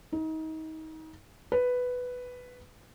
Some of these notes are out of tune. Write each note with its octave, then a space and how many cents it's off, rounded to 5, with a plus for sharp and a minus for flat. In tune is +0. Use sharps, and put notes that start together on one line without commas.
D#4 +30
B4 +5